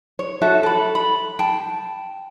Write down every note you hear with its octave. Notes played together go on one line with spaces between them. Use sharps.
C#5
F#4 A4 E5
A4 B5
B5
G5 A5